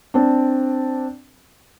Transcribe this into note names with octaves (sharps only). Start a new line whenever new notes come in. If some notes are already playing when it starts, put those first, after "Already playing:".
C4 D4